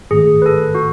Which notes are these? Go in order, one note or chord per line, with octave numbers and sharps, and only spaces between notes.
G#2 D#3 A3 G#4
B4
A4
F#4